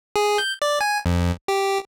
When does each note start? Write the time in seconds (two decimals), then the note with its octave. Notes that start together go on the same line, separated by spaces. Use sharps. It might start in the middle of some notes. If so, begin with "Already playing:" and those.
0.16 G#4
0.38 G6
0.62 D5
0.81 G#5
1.06 F2
1.48 G4